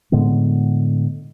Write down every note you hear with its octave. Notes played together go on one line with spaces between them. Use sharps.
A2 D3 G#3 B3